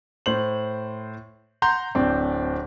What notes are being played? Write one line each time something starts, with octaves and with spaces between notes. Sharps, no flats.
A2 C5 F#7
F#5 A#5 C6 G6
D1 C4 D4